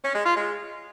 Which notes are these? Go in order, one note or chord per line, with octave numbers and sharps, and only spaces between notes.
C#4
G#3
F4
G#3